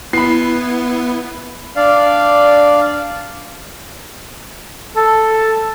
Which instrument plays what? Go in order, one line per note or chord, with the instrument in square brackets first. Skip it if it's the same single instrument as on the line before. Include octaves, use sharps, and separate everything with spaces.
[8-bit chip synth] B3 [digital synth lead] E4 [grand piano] B5 C7
[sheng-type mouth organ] D4 D5 F5
[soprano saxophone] A4